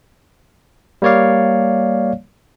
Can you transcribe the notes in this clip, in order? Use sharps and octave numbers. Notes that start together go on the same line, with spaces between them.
G3 A#3 C#5 D5 F5